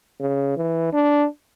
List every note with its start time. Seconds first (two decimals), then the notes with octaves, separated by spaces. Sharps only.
0.20 C#3
0.57 E3
0.93 D4